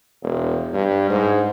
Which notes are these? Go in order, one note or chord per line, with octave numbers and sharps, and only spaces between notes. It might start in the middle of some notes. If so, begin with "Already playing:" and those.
E1
G2
G#2